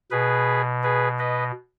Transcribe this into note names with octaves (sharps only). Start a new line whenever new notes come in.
B2 G#4 B4
G#4 B4
B4 D#5